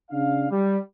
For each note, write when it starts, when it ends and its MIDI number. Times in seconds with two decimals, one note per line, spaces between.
0.11 0.46 49
0.11 0.46 62
0.11 0.46 77
0.51 0.77 55